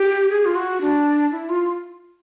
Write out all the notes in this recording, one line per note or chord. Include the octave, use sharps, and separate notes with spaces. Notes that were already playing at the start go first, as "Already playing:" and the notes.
Already playing: G4
G#4
F4
F#4
D4
E4
F4